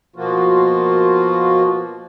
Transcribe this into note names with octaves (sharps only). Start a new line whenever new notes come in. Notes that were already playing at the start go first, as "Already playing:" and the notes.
B2 F3 A#3 F4 F#4